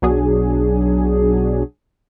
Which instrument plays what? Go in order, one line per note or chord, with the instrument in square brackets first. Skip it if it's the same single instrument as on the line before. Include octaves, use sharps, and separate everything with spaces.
[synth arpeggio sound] B1 F#3 D4 G#4